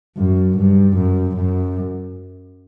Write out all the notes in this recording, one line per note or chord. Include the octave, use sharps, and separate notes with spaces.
F#2
G2
F#2
F#2